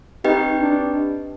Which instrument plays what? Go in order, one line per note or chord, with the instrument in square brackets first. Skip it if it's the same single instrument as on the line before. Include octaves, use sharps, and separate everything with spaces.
[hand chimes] C4 G4 B4 D#5 G5 [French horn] D#4
[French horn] D4